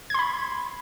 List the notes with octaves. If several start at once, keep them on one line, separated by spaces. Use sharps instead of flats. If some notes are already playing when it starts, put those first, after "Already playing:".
B5 C6 G#6